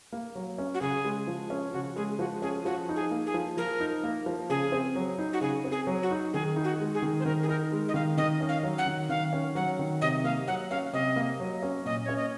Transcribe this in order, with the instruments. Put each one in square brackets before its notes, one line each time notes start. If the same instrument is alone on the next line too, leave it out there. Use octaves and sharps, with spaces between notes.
[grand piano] A#3
F#3
C#4
[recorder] F#4
[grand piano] C#3 [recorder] G#4
[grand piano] G#3
F3
C#4
[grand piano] C#3 [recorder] F#4
[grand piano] G#3 [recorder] G#4
[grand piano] F3 [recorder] F#4
[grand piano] C#4 [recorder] G#4
[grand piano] F3 [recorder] F#4
[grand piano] D#4
[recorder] G#4
[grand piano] A#3
[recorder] G#4
[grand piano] F3
[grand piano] F3 [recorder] A#4
[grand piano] D#4
A#3
F3
[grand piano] C#3 [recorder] G#4
[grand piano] C4
F#3
D#4
[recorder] F#4
[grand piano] C#3 [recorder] G#4
[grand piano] C4
[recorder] G#4
[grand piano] F#3
[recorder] F#4
[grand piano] D#4
[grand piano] D#3 [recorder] G#4
[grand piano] D#4
[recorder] F#4
[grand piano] G#3
[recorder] G#4
[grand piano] D#3
[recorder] C5
[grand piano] D#3 [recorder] A#4
[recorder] G#4
[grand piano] D#4 [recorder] A#4
[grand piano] G#3
[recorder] D#5
[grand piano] D#3 [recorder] F5
[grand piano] D#3 [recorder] D#5
[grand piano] C#4
[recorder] F5
[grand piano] F#3
[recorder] F#5
[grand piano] D#3
[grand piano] D#3 [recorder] F5
[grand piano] C#4
[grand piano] F#3 [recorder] F#5
[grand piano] D#3
[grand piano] C3 [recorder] D#5
[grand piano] A#3 [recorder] F5
[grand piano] F#3 [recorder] F#5
[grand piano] C#4 [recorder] F5
[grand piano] C3 [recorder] D#5
[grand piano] A#3
F#3
C#4
[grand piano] A#2 [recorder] D#5
[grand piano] C#4 [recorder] C#5
[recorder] D#5